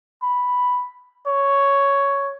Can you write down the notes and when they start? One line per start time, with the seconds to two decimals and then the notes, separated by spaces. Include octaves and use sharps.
0.22 B5
1.27 C#5